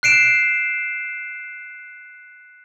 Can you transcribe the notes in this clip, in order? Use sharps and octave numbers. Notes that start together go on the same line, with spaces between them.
F#6 C7 D7 E7